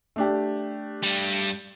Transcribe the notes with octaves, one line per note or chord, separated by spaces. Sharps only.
A3 D4 G4
G2 G3